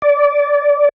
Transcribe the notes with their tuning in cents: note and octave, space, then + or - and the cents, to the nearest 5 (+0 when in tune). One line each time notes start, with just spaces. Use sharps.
D5 -20